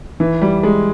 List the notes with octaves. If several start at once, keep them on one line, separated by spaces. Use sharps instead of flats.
E3
G3
G#3